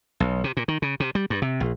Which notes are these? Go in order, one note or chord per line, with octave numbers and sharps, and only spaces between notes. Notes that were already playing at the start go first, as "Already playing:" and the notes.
B1
C3
A#2
D#3
C#3
C3
G3
G2
C3
A#1